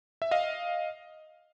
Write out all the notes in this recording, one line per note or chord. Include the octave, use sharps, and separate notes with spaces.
E5
D#5 F5